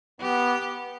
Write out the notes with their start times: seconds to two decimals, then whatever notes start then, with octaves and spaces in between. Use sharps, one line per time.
0.20 B3 G4